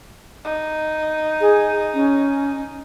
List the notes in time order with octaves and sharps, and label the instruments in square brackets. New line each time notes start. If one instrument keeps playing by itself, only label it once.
[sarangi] D#4
[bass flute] G#4
C#4